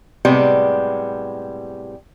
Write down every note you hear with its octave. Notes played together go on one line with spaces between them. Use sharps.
A2 C3 G3 G#3 B3